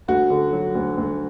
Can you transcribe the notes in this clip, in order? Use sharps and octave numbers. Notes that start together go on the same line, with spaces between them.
D2 F#4
D3
F#3
D2
D2